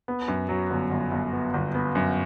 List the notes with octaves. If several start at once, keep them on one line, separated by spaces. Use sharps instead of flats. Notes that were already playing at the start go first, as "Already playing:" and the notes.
B3
F#2
F#3
G1
G1
G1
B3
G1
B3
F#2